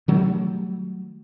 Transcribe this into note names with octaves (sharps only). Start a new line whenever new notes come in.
D#3 F#3 G3 A3